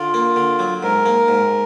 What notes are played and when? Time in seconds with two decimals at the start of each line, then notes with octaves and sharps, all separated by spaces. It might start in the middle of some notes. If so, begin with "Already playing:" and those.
Already playing: D3 F4
0.14 A#3
0.36 D3
0.59 F#3
0.83 G#2 A#4
1.06 A#3
1.28 G#2